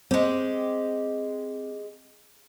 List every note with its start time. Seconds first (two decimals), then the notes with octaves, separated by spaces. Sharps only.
0.11 G#3 C4 G4